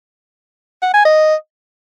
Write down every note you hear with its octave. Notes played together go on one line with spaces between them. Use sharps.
F#5
G#5
D#5